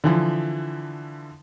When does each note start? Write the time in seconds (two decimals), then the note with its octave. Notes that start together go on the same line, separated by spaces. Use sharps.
0.04 D3 E3 F3